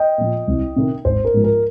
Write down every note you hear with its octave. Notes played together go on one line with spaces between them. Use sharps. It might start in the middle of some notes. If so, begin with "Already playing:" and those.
Already playing: D#5 G5
A#2 F3
C2
C3 D#3
G#1 C5
A#4
G#2 F3
A#4